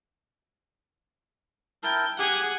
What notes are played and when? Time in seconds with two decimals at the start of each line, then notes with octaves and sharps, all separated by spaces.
1.83 E4 A#4 G5 A5
2.19 G4 G#4 F#5 G#5